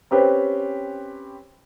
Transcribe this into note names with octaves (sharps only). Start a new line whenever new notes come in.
C4 C#4 G4 B4 C5